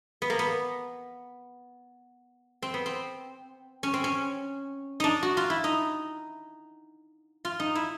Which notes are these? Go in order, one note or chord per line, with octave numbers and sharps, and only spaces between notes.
B3
A#3
B3
C4
B3
C4
C#4
C4
C#4
D4 D#4
F#4
F4
E4
D#4
F4
D#4
E4